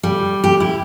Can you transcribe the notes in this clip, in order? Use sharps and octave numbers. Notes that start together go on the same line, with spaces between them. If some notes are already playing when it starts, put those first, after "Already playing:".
G3
G4
E4